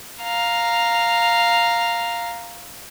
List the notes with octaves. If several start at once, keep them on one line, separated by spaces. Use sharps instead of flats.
F5 A#5